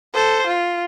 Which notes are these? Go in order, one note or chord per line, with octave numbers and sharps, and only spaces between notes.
A4 C5
F4